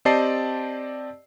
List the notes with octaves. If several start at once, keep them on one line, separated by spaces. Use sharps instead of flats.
C4 G4 D5 D#5 A5 C7